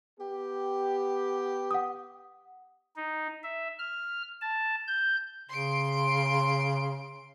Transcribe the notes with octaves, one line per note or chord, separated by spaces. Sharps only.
B3 G4
F#5 D#6
D#4
E5
F6
A5
G6
C#3 C6 D7